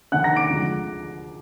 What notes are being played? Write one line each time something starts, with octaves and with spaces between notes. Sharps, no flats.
F1 D#2 D#3 A#3 D4 F#5 F#6
A#5 A#6
D6 D7
D2 D3 F3 G#3